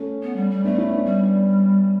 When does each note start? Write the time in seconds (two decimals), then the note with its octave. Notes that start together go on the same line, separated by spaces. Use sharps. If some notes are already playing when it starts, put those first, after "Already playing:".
Already playing: A3 C#4
0.23 B3
0.36 G3
0.50 G3
0.64 A3 B3 D4
0.78 C#4 E4
0.91 B3 D4
1.05 G3 B3 D4